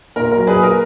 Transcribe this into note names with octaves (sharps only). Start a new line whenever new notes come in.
A#2 A#4
A#4
F#3
G#4 B4
A#2
A#4